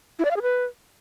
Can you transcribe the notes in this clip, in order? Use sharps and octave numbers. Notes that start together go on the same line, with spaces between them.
E4
D5
F5
G#4
B4